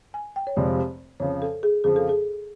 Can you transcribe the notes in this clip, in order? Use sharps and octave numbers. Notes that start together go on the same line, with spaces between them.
G#5
G5
C#5
F1 F2 C3 F3 G#3 D5
F2 C#3 F3 C#5
A4
G#4
F2 C#3 F3 G#4
A4
G#4